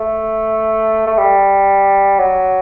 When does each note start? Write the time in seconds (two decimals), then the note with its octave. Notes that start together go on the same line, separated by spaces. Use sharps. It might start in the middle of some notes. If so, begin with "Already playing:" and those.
Already playing: A3
1.07 A3
1.18 G3
2.19 F#3